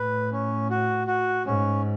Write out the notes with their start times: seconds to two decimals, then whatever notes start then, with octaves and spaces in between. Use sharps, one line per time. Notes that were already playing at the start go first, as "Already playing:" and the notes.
Already playing: A2 B4
0.32 C#4
0.70 F#4
1.07 F#4
1.46 G#2 C#4